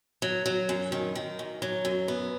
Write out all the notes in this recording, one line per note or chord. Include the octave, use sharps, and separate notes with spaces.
F#3
F#3
F#2
D#3
D#3
F#2
F#3
F#2
B3